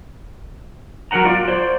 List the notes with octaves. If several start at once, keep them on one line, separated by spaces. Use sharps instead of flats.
F#3 A#4 B4 F#5 A#5
F4 D5
C5 D5